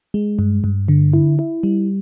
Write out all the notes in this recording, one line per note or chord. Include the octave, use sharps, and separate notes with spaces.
G#3
G2
G2
D3
E4
E4
G3